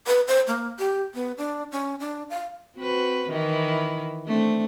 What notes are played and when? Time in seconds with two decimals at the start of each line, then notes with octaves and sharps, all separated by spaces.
0.07 B4
0.28 C5
0.48 A#3
0.79 G4
1.14 B3
1.38 D4
1.72 C#4
2.00 D4
2.30 F5
2.76 C4 F#4 B4
3.29 D#3 E3 E4
4.26 A3 C4 D4